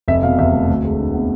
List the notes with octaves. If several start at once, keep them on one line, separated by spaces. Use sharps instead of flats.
F1 E5
B2 F5
E2 E5
A3
D2
G#3
D3
B3